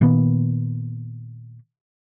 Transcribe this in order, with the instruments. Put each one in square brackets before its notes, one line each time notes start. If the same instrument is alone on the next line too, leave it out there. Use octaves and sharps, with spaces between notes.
[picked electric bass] A#2 D#3 A#3 B3